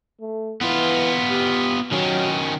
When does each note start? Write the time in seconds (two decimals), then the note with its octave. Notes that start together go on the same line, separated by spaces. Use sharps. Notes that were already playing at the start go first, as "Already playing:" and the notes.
0.21 A3
0.61 E3 B3 F4
1.30 G4
1.92 D#3 F#3 C#4